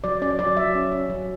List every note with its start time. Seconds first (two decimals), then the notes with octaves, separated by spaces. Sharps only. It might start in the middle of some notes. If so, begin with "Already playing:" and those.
0.04 F#3 D5
0.22 C#4 D5
0.39 F#3 D5
0.57 F#3 E5
0.75 C#4
0.92 C#4
1.10 F#3